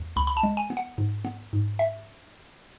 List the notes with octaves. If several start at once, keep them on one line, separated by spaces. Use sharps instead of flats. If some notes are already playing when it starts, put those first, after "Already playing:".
Already playing: E2
C#2 B5
B5
A5
G#3
G#5
B3
F#5
G#2
B3
G#2
E5